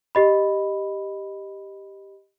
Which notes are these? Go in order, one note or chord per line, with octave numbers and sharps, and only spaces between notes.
G4 D#5 B5